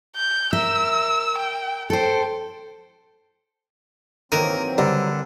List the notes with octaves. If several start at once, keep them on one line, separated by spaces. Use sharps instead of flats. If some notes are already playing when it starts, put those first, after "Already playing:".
G6
A#4 E5 E6
G5
A4 C5 G5
D#3 E3 F#3 A#3 C4 A#4 D#7
D3 G3 A#4